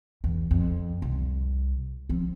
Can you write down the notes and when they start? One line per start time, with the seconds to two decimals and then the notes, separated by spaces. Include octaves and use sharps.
0.24 E2
0.51 F2
1.02 C2
2.09 F3 C4